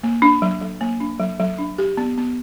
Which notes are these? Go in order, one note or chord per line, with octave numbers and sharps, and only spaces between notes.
A#3
D4
F#3
F#3
A#3
D4
F#3
F#3
D4
G4
B3
B3